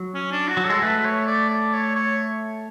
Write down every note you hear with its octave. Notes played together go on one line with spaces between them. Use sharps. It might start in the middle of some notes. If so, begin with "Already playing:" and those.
Already playing: F#3
C#4
D4
F#4
F#3
G#3 A4
A3 B4
C#5
D5
D5
C#5
C#5